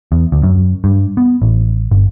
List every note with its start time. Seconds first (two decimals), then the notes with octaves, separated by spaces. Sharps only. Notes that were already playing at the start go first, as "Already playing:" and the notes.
0.12 E2
0.32 D2
0.43 F#2
0.84 G2
1.17 B3
1.42 A1
1.91 G1